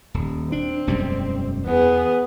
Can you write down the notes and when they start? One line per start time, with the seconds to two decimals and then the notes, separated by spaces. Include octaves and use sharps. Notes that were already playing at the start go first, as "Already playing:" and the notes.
0.14 D#1
0.52 C4 D4
0.87 E1 F#2 G3
1.66 E2 B3 G#4